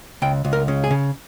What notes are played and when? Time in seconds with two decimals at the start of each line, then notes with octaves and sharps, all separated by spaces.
0.22 C#2 G5
0.45 C#2
0.53 A#4
0.68 C#3
0.84 G#4
0.91 C#3